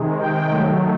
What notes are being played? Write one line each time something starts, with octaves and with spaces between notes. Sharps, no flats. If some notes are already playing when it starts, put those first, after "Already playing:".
Already playing: C3 D#3 G#3
G5
D#3 F#3 A3